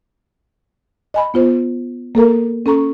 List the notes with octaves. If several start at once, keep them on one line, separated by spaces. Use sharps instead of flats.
D#5 G#5 B5
B3 F4 C5
A#3 A4 A#4 A#5
C#4 A4 A#5 C#6